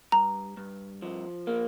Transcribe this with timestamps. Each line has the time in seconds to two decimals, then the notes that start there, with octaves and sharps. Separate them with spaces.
0.12 G2 A#5
0.57 G2
1.02 F3
1.47 A#3